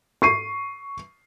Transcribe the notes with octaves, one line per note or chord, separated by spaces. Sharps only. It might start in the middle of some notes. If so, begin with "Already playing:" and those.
C#6 C7 D#7